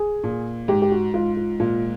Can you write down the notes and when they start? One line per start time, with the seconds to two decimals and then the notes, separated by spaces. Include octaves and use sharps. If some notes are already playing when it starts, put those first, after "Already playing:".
Already playing: G#4
0.24 A#2
0.68 G#2 G4
0.82 G4
0.92 F#4
1.14 G#2 F4
1.37 F4
1.60 A#2 F4